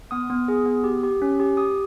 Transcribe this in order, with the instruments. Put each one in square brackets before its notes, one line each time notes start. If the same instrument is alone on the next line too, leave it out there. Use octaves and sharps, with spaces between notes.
[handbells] B3 D#6
B3
G#4
B3
G4
G4
C#4
G4
G4 D#6